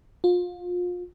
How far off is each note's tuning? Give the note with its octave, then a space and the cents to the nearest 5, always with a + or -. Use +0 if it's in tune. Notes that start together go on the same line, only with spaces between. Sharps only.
F4 +30